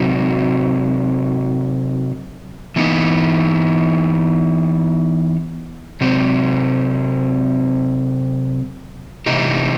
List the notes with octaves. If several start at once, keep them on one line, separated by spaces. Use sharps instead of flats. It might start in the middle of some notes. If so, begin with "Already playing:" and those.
Already playing: C3 F#3 C4 D#4 F#4
E3 B3 D#4
C3 F#3 C4
C3 E3 A3 D#4 G4